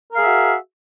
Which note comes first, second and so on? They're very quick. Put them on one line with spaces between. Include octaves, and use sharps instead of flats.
A#4 F5 G#4 E5 F#4